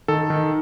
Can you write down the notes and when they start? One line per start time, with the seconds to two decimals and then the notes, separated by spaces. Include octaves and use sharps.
0.08 D#3 A4
0.30 D#3